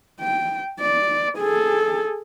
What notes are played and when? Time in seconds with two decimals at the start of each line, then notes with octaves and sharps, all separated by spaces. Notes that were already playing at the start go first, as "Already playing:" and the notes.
0.21 G5
0.80 D5
1.39 G#4 A4